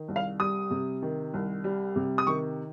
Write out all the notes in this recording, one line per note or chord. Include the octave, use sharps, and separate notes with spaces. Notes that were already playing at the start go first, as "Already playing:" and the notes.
Already playing: D#3
C2
F5
G3 D#6
C3
D#3
C2
G3
C3
D#6
D#3 C#6